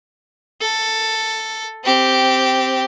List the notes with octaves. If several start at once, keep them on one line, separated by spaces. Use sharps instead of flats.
A4
C4 G4